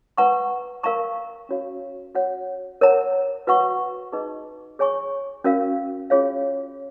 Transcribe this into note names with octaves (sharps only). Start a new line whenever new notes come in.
B4 F#5 A#5 C#6
A#4 F5 A#5 C#6
C#4 F#4 C#5 F5
F#4 C#5 F#5
A#4 C#5 F#5 A#5
F#4 B4 F#5 C#6
D#4 G#4 B4 D#5 A#5
G#4 C#5 G#5 C#6
C#4 F#4 A#4 F5
C#4 F4 G#4 C#5 F5